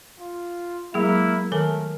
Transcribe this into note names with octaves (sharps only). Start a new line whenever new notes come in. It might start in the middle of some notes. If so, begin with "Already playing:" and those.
F4
F#3 G#3 A#3 E4 G#4
D#3 A3 A4 A#4 G#5